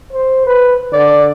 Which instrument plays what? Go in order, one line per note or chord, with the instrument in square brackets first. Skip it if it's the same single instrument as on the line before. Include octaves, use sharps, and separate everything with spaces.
[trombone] C5
B4
[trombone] D3 [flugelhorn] D5